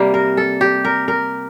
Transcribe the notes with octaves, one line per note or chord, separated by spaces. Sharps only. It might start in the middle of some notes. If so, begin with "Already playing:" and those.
Already playing: C3 G3 A#3
A#4
A4
G4
A#4
A#4